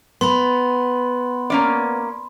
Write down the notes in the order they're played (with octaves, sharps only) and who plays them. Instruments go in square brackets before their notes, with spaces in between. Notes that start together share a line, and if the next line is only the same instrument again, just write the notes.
[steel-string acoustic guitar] B3 [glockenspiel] B5 C6
[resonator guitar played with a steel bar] A#3 C#4 D5